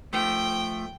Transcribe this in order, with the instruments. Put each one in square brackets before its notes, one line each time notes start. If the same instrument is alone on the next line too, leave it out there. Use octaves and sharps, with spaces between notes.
[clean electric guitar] F3 A3 [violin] G5